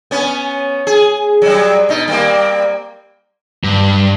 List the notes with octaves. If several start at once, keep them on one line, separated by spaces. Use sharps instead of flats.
B3 C#4
G#4
F#3 G3
B2 D#4
G3 A#3 C4
G2